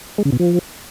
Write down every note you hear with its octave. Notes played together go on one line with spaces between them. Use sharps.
G#3
C#3
B2
F3